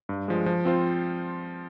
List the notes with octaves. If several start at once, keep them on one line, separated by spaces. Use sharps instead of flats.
G2
F3 G#3
F3
C4 F4 C5